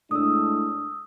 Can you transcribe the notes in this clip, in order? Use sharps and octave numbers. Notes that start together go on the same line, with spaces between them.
A2 G#3 D4 D#6 E6